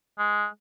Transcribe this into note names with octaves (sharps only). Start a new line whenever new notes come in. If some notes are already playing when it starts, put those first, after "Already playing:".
G#3